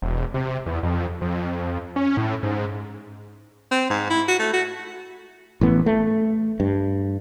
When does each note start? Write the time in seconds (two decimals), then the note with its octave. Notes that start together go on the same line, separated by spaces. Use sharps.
0.02 E1
0.34 C3
0.66 E2
0.83 F2
1.21 F2
1.96 C#4
2.17 A2
2.43 G#2
3.71 C4
3.90 G#2
4.10 E4
4.28 F#4
4.40 A3
4.53 F#4
5.61 A1 E3 B3
5.86 A3
6.60 G2